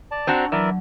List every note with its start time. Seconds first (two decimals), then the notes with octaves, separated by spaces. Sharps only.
0.11 D5 A5
0.27 C4 D4 F#4 A#5
0.52 E3 F#3 A#4 D5 E5